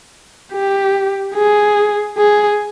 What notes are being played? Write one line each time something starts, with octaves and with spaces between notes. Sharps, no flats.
G4
G#4
G#4